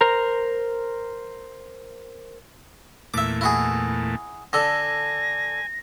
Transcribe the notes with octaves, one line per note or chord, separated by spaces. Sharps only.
A#4 C5 A#5
E2 A#2 A3 E5 D6
E4 F#4 G#4
D3 A4 G#5 A#6